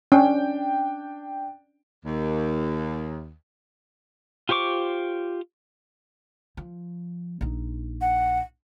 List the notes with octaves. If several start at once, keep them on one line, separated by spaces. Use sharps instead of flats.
C#4 D4 G5
D#2
F4 G4 C5 C#6 D6
F3
A#1 D#4
F#5